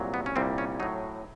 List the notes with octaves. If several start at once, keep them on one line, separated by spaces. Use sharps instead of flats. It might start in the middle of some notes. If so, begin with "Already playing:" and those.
Already playing: C2 A#2 F#3
B3
C#4
C2 A#2 G3 C4
C#4
A2 F#3 D#4